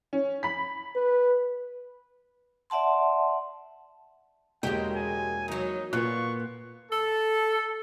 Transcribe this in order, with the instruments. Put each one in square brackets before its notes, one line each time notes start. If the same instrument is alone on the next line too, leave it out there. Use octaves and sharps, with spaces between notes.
[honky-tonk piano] C#4
B5 B6
[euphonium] B4
[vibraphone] D5 E5 F#5 A5 C6
[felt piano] E1 [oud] G#3 G4 [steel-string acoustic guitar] A#3 F#4 C#5 [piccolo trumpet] G5
[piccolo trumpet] G#5
[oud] E2 F#3 [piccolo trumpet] D#4
[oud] A#2 [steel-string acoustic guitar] A#3 B3 F4 [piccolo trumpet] C#6 [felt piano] F#6
[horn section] A4